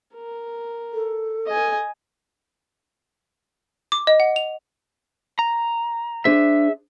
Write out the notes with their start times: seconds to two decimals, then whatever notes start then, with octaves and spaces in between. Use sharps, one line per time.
0.15 A#4
0.93 A4
1.47 D#5 G#5
3.92 D6
4.07 D#5
4.20 F#5
4.36 F7
5.39 A#5
6.25 D4 G#4 C5 E5